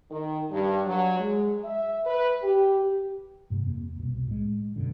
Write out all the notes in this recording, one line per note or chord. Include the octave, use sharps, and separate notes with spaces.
D#3
G2
F#3
G#3
E5
B4
G4
A1 G2 C3 A3
F2 A#3
C2 B2
A2 G#3
F#2 B2 D3